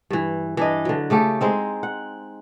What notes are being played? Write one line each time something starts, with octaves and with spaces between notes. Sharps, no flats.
G2 E3
E3 D4 D#5
D3 F#3
C#3 A3 G4 A4
G#3 C4 D#4
F#5